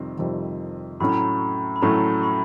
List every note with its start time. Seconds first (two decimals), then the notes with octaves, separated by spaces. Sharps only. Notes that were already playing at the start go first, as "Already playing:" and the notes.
Already playing: F2 C3 D#3 G3 C4
0.18 F2 C3 D#3 G3 C4
1.00 A2 F#3 A3 C#4 B5
1.09 A#5
1.18 B5
1.76 B5
1.82 A2 F#3 A3 C#4 A#5
2.23 B5